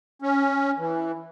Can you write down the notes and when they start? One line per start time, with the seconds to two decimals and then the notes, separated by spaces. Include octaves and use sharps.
0.22 C#4
0.78 E3